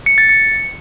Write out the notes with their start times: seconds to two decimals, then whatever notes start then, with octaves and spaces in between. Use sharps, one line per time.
0.06 C#7
0.18 A6
0.29 C#7